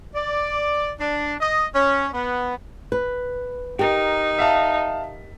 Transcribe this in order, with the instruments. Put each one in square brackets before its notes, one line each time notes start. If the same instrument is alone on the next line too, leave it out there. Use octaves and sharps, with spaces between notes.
[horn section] D5
D4
D#5
C#4
B3
[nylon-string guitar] B4
[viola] D#4 [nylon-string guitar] G4 A#4
[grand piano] E5 F5 A5